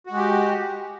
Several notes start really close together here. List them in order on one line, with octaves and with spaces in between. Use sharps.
F#4 G#3 G4